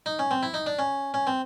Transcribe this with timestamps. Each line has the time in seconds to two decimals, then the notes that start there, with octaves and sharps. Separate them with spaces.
0.06 D#4
0.19 C#4
0.31 C4
0.43 E4
0.54 D#4
0.66 D4
0.79 C#4
1.14 C#4
1.27 C4